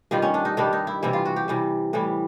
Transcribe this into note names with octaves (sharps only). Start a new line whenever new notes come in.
G2 D#3 G3 F4
C#4
D4
D#4
G2 D#3 G3 D4
D#4
E4
C3 E3 G3 E4
F4
F#4
G4
C3 E3 G3
A2 E3 G3